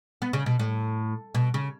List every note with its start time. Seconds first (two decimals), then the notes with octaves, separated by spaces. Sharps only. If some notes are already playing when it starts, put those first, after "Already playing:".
0.22 B3
0.33 C#3
0.46 B2
0.59 A2
1.35 B2
1.54 C#3